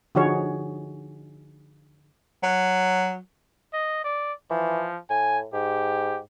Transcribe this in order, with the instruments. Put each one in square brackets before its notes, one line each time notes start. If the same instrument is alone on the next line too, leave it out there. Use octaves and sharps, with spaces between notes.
[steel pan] D3 F3 D#4 F#4 G#4 C#5
[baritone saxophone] F#3
[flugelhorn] D#5
D5
[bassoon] E3 [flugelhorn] F3
[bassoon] A2 [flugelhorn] G#5
[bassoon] G#2 [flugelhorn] G4